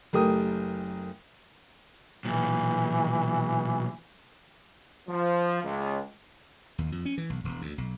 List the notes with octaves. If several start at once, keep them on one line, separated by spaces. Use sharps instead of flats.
F#1 A3 G4 A#4 D#6
B1 A#2 E3
F3
C#2
D#2
F2
C#4
E3
B1
E1
D2
B1